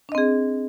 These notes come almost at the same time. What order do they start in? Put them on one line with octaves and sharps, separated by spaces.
D4 D#5 C4 G#4